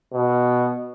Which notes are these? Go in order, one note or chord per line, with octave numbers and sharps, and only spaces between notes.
B2